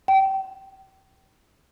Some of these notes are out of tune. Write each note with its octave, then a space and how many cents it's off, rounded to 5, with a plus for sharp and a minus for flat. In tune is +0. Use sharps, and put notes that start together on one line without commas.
G5 -30